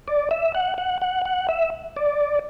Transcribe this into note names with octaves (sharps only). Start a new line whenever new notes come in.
D5
E5
F#5
F#5
F#5
F#5
E5
D5